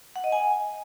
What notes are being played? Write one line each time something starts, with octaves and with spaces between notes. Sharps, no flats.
F#5
D#5
G#5